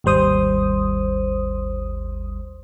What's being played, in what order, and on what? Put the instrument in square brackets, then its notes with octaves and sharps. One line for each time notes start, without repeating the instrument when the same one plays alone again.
[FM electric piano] G#1 D#2 G3 C5 D#6